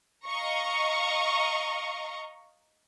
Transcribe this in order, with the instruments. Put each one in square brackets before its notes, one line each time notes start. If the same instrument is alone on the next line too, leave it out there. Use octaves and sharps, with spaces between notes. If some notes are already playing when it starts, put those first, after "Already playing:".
[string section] D#5 F5 A#5 C#6